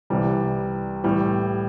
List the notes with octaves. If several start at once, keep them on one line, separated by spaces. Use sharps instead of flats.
C2 C3 E3 G3
A2 E3 G3